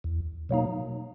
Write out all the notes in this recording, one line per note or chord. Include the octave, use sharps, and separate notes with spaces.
E2
B2 F#3 A#3 D#4